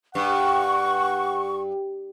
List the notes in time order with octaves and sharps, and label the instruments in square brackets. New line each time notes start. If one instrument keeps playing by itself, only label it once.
[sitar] G2 [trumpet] F#5 [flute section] C#6